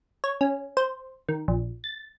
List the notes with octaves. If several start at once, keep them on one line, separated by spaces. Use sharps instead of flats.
C#5
C#4
C5
D#3
A#1
A6